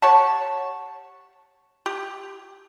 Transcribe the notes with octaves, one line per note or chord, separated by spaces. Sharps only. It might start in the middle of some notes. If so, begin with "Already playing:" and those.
G4 C#5 F#5 A5
G4